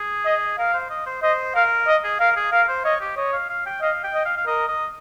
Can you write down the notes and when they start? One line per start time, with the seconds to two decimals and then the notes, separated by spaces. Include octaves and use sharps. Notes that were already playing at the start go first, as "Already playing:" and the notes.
Already playing: G#4
0.25 D#5
0.58 A#4 F5
0.74 C5
0.90 D#5
1.07 C5
1.22 C5 D#5
1.54 A#4 F5
1.87 D#5
2.04 G#4
2.20 A#4 F5
2.36 G#4
2.52 A#4 F5
2.68 C5
2.85 C#5 D#5
3.01 G4
3.17 C#5 D#5
3.33 F5
3.49 F5
3.66 G5
3.81 D#5 F5
4.04 G5
4.14 D#5
4.25 F5
4.37 F5
4.46 A#4 D#5
4.68 D#5